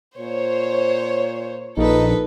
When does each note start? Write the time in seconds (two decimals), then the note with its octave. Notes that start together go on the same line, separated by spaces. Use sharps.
0.18 A#2 C5 C#5
1.77 A#1 D#4 A4 B4